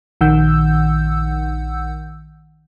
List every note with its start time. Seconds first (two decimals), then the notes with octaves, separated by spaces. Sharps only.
0.21 A#1 D#3 F#5 E6 G6